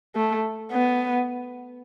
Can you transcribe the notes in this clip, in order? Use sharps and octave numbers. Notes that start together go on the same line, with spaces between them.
A3
B3